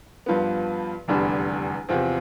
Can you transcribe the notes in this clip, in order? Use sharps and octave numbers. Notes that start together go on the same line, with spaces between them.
G2 F3 B3
F1 E2 D3 G3 D4
E2 C3 F3 C4